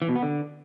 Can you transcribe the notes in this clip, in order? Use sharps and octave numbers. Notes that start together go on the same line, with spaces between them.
E3
B2
B3
D3